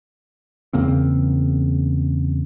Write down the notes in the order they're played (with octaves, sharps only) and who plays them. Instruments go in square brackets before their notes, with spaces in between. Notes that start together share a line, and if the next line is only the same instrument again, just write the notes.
[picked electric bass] E2 C#3 A#3 C4